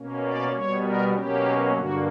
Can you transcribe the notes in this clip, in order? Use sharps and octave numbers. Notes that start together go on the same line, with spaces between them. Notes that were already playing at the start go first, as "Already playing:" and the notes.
Already playing: B2 A#3 C#4
D5
B2 G3 B3 C#5
A#4
B2 F#3 A#3 C#4 G4
G2 D3 A#3 F#4